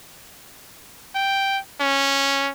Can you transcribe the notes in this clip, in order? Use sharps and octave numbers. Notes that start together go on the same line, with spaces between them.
G5
C#4